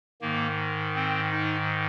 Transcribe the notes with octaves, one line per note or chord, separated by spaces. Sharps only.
G#2 D#3 A#3
C4
D#4